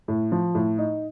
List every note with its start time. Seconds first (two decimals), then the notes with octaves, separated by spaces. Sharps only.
0.08 A2
0.32 F3
0.55 A2
0.78 D#4